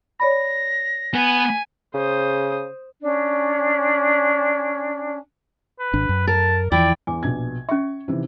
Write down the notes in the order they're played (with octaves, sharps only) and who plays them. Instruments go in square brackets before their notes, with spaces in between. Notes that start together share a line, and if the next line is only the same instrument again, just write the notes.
[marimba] C#5 D5 B5 [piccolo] A#6
[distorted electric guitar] B3 [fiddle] G#5
[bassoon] C#3 [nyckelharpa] C5 D#6
[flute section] C#4 D4
[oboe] B4
[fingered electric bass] G#1 D4
F#2
[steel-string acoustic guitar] A#4 [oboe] A5
[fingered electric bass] E2 E3 F3 [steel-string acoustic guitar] E4 G5 [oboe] D5
[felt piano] E2 [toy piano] G#5 D6
[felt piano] A#1 B2 G#6
[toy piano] C#4 E5 [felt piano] C#6
[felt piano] C3 D#3 E3